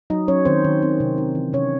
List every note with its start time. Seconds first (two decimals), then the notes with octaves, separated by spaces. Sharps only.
0.10 F#3 D#4 D#5
0.28 F#3 C#4 C#5
0.45 D#3 C4 C5
0.65 D#3
0.82 C4
1.00 C3
1.18 D#4
1.35 E3
1.53 C3 C#4 C#5